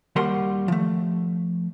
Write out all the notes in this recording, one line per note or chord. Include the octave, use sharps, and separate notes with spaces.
D#2 G3 F#4 A#4 F#5 C6
F3 A3